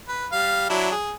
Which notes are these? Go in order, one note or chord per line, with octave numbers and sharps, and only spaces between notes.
B4
G3 F5
F#3 D4 E4
G#4